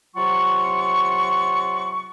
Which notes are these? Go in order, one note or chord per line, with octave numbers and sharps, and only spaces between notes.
C3 F#3 F4 F#5 C#6